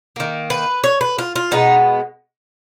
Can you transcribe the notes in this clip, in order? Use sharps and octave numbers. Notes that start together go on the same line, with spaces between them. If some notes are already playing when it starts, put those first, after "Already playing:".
D#3 A#3
B4
C#5
B4
F4
F4
B2 G#3 B3 D#4